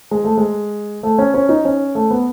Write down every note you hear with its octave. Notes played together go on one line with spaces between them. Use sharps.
G#3
A3
G#3
A3
C#4
C#4
D#4
C#4
A3
B3